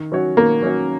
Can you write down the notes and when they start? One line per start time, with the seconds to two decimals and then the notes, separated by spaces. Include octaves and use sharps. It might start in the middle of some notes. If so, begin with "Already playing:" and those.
Already playing: D#3
0.12 F#3 C#4 F#4 C#5
0.37 D#3 A#3
0.62 F#3 C#4 F#4 C#5